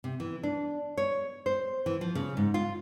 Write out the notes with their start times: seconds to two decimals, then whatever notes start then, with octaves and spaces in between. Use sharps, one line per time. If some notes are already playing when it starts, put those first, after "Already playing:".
0.04 C3
0.20 E3
0.43 D4
0.97 C#5
1.46 C5
1.86 E3
2.01 F3
2.15 C#3
2.37 G#2
2.54 F4